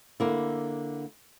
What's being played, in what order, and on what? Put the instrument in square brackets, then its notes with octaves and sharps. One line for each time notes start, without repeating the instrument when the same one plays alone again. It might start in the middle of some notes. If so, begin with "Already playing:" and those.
[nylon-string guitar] D3 A#3 E4